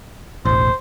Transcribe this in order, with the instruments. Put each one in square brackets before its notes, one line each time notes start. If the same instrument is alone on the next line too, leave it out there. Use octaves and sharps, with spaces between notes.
[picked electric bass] E1 A1 [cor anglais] C5